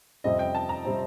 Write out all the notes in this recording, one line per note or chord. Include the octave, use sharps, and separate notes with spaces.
F2 C3 G3 C4 D#5
G5
A5
A#5
C3 G3 C4